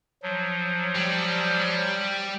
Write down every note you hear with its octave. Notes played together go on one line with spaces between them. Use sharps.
F3 F#3
G3